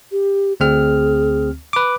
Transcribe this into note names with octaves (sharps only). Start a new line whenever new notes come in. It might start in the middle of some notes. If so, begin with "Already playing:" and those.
G4
D2 C4 G#4 F6
B4 D6